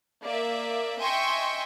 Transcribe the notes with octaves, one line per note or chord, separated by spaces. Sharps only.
A#3 D5 E5
D#5 E5 G5 G#5 C6 C#6